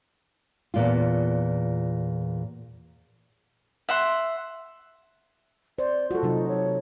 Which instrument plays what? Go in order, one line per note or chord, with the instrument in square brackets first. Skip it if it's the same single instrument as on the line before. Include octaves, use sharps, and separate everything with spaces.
[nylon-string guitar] E2 A#2 F4
[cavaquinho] E5 F#5 C6
[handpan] C5 [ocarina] D5
[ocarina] F4 [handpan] F#4 A4
[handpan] C3 F#3 D#4
[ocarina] C#5